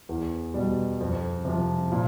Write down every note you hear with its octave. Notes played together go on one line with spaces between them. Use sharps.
E2
B2 G3
F2
C3 F3
A#2